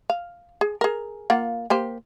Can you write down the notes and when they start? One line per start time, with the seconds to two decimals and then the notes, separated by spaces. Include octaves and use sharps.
0.10 F5
0.61 G#4
0.81 G#4 A#4
1.30 A#3 F4 F#5
1.70 A#3 G4 C5